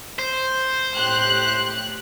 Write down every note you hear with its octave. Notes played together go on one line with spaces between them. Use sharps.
C5
A2 G4 F#6